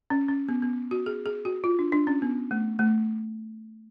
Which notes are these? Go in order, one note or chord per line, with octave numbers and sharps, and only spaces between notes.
C#4
C#4
B3
B3
F#4
G#4
G#4
F#4
F4
D4
D4
C#4
B3
A3
A3